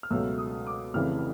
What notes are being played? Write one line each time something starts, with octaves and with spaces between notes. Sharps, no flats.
F6
C#2 B2 F#3 A3 E6
D#6
D6
F1 F2 C#3 E3 F6